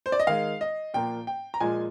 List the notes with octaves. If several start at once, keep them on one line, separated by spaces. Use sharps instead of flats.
C5
D5
D#5
D#3 G#3 F5
D#5
A#2 F3 A#3 G5
G5
A#5
A#2 F3 G#3 G#5